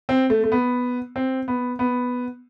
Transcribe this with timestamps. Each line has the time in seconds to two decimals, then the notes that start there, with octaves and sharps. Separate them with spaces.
0.09 C4
0.30 A3
0.44 A3
0.52 B3
1.16 C4
1.48 B3
1.79 B3